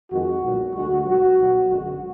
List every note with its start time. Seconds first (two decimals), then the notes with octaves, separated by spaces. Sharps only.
0.11 F2 D#3 G#3 F#4
0.43 B1 A#2 F#3
0.74 D2 D3 G#3 F#4
1.05 B1 B2 F#3 F#4
1.38 B1 B2 F#3
1.69 G#1 F#2 D3 G#3 F#4